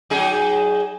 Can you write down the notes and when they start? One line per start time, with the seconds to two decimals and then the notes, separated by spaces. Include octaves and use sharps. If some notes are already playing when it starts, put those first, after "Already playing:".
0.10 F#3 D#4 G#4